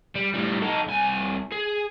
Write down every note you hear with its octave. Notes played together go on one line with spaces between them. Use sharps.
G3
A2 G3
D#4 A4
C2 G#5
G#4